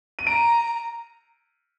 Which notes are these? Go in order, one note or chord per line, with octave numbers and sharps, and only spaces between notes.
D#7
A#5 D7